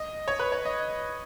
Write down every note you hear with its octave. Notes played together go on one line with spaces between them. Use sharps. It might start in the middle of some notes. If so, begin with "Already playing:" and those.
Already playing: D#5
C#5
B4
C#5
D#5